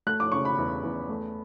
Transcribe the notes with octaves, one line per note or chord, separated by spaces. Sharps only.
A3 F#6
D6
C#3 C#6
B5
E2
E2
A3